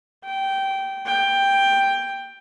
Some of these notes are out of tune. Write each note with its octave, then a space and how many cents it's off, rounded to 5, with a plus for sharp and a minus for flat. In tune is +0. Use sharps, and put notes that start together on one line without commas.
G5 -15
G5 +10